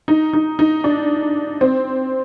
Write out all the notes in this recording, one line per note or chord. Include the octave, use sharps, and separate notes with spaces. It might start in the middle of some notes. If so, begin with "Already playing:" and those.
D#4
D#4
D#4
D4
C4